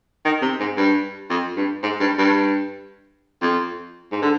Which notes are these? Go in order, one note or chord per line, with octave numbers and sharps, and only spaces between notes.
D#3
C3
G#2
G2
F2
G2
G#2
G2
G2
F2
G#2
D3